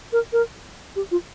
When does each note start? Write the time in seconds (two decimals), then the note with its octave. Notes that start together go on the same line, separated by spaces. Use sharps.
0.13 A#4
0.33 A#4
0.96 G4
1.11 F4